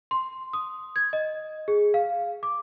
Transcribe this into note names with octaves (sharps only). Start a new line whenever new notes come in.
C6
D#6
G#6
D#5
G#4
F5
D6